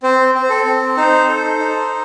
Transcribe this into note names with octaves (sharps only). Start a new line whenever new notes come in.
C4 C5
C4
C5
A4
C4
D#4 C5
A4
D#4